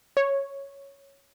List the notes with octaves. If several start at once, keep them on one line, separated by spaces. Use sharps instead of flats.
C#5